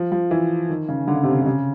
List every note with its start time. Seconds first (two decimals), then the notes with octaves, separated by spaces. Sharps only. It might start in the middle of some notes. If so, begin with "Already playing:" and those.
Already playing: F3
0.12 F3
0.31 E3
0.69 D#3
0.88 C#3
1.08 D3
1.15 C#3
1.23 C3
1.31 C#3
1.41 C3
1.46 C#3